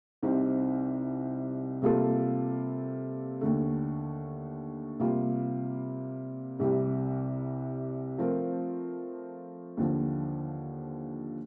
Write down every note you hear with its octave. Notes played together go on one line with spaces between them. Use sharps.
C2 C3 G3 C4 D#4
C3 G3 A#3 F4 A4
D#2 D3 A3
C3 G3 A#3 F4
C2 C3 G3
F3 A3 C4 F4 A#4
D#2 D3 F3